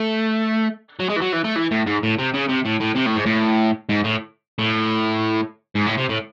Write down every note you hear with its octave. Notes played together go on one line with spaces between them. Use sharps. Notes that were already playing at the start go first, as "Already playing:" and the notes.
Already playing: A3
F#3
G#3
E3
F#3
E3
A3
E3
A2
G#2
A2
C3
C#3
C3
A2
A2
C3
A2
G#2
A2
G#2
A2
A2
G#2
A2
C3
A2